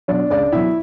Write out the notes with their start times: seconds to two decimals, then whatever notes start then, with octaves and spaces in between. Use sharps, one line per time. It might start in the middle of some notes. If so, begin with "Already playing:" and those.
0.08 B2 F#3 D4 D5
0.30 C#2 D4 D5
0.52 B2 F#3 E4 E5